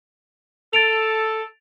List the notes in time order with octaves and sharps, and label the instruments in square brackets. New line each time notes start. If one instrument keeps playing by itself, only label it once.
[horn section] A4 [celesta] A6 D7 F7